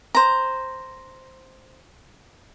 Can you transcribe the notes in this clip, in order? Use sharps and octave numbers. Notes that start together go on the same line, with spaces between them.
C5 A#5